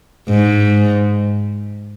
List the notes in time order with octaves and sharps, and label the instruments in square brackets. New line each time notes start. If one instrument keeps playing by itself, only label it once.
[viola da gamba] G#2